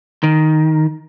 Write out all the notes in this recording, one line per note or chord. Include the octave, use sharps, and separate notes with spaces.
D#3